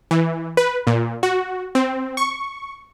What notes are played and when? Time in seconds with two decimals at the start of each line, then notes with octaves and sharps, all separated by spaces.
0.11 E3
0.57 B4
0.87 A#2
1.23 F#4
1.75 C4
2.17 C#6